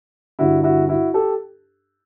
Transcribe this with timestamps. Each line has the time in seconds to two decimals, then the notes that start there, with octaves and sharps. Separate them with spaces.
0.39 G1 G2 D3 E4 F#4
0.64 E4 F#4
0.89 E4 F#4
1.14 G4 A4